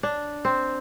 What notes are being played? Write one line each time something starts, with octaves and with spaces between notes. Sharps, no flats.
D4
C4